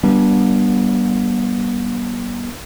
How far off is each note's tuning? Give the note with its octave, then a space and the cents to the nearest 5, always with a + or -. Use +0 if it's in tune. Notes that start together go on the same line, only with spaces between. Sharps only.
G3 -25 B3 -40 D4 -10